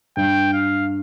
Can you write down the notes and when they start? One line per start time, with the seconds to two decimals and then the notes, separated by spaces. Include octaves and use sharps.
0.17 G2 G5
0.53 F5